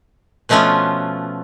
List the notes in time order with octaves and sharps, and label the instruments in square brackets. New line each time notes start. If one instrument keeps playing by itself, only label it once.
[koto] B2 F3 A3 B3 C#4 F4